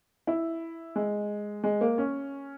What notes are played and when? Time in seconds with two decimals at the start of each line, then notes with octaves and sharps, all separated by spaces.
0.27 E4
0.96 G#3
1.63 G#3
1.81 A#3
1.98 C#4